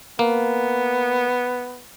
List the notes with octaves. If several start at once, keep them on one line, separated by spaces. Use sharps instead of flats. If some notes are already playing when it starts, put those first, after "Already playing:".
A#3 B3